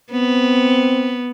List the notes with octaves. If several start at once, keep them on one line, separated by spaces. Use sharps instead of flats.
B3 C4